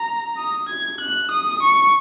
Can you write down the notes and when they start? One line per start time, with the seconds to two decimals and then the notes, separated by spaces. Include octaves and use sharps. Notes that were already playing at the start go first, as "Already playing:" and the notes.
Already playing: A#5
0.38 D#6
0.69 G#6
1.01 F#6
1.31 D#6
1.63 C#6